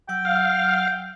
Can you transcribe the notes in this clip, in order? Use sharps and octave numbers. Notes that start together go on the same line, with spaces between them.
F#3 F#5 G5 E6
F5